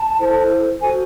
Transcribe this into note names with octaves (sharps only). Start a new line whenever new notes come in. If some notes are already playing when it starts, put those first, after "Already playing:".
Already playing: A5
E4 A4 C5
F#4 A4 C5 G#5